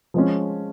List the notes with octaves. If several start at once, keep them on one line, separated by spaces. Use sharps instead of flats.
F3 G#3 C#4